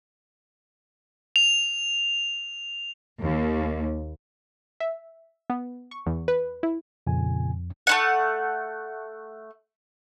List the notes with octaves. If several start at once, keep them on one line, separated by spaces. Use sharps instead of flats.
F7
D#2
E5
B3
C#6
E2
B4
E4
F2 A#2 C#3 G#5
A3 C#4 F#5